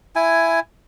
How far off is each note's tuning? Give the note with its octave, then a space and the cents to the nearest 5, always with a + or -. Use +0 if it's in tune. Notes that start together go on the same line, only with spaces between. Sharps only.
E4 +10 G#5 +0